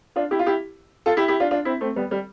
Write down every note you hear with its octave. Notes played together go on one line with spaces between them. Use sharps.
D4 F4
E4 G4
F4
E4 G4
F4 A4
E4 G4
E4 G4
D4 F4
D4 F4
C4 E4
A3 C4
G3 B3
G3